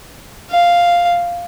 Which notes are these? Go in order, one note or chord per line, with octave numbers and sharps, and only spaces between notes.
F5